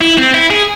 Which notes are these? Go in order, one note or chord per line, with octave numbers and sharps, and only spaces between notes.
E4
C4
E4
G#4